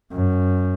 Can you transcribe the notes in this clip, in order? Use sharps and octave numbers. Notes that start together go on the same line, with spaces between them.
F#2